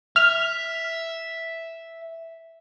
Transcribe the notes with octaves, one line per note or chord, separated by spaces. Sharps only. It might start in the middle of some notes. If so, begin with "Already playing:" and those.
E5 F6